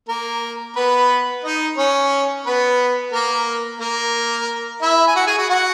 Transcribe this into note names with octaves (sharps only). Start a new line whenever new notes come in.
A#3 A#4
B3 B4
D#4 D#5
C#4 C#5
B3 B4
A#3 A#4
A#3 A#4
E4 E5
G#5
F#4 F#5
G#4 G#5
F#4 F#5
F#4 F#5